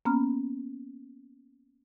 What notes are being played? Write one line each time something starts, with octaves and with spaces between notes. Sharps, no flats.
A#3 B3 C#4 A#5 B5 F6